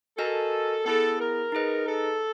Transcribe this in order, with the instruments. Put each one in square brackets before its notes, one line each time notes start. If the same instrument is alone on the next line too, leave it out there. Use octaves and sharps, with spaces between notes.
[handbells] F#4 A#4 D#5 G#5 [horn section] A4
[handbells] B3 E4 G#4 [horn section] A4
[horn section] A#4
[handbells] D#4 G#4 B4 D#5
[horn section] A4